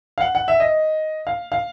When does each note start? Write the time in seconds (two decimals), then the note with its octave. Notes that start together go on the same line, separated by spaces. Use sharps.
0.18 F5
0.21 F#5
0.35 F#5
0.48 E5
0.60 D#5
1.27 F5
1.52 F5